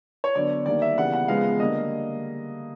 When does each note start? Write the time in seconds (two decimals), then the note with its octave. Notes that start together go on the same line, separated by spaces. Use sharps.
0.24 C#5
0.35 D3 F#3 B3 D5
0.66 D#3 G3 A#3 D5
0.82 E5
0.97 C#3 E3 G3 B3 F#5
1.14 F#5
1.28 C#3 F3 G#3 B3 F5
1.59 D3 G3 A#3 D#5